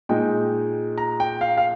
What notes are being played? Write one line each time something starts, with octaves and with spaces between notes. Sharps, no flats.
A#2 G#3 D#4 G5
A#5
G5
F5
F5